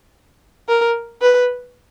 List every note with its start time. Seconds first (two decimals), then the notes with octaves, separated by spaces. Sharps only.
0.68 A#4
1.22 B4